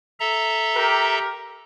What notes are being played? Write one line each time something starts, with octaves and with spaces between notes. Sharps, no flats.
A4 E5 A#5
G4 A#4